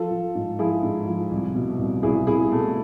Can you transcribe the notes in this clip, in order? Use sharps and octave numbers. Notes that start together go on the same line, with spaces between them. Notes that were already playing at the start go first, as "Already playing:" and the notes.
Already playing: F3 F4 A4
F3
G#2
F3 E4 G#4
G#2
F3
C2
B2
C2
C2 E4 G#4
C2 E4 G#4
B2 A3